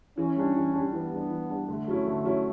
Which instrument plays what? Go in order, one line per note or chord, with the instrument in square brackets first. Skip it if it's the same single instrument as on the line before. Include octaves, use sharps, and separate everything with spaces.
[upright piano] E3 [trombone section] C#4
[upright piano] G3 D4
E3
G3 D4
[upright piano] E3 [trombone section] B3
[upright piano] G3 D4
E3
G3 D4
[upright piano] D3 [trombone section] A3
[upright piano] F#3 C#4 E4
D3
F#3 C#4 E4